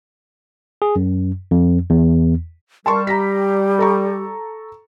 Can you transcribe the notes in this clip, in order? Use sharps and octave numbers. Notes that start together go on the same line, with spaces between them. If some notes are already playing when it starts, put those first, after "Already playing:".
G#4
F#2
F2
E2
G3 A#4 A5 C6 C#6
G4 A#5 A#6 B6
A4 A#5 C#6